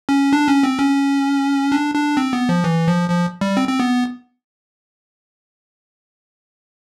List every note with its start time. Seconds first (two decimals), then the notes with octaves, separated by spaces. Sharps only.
0.09 C#4
0.33 D4
0.48 C#4
0.63 C4
0.79 C#4
1.72 D4
1.95 D4
2.17 C4
2.33 B3
2.49 F3
2.64 E3
2.88 F3
3.10 F3
3.41 G3
3.57 C4
3.68 C4
3.80 B3